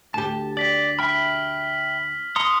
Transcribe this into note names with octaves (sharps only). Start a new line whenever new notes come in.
D2 G4 A5
D5 B6 F#7
E5 G5 B5 F6 B6
A#5 C6 D#6 C#7